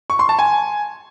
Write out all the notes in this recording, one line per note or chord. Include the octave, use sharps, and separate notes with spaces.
C#6
C6
A5
G#5